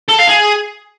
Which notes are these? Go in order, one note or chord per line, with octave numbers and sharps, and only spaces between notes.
A4
F5
G#4